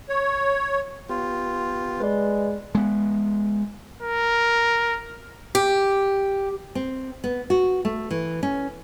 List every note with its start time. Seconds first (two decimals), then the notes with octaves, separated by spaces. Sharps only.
0.09 C#5
1.09 B3 F4 G4
2.00 G#3 B4 D5
2.75 G#3 B3
4.02 A#4
5.55 G4
6.75 C4
7.24 B3
7.50 F#4
7.85 A3
8.11 E3
8.43 C#4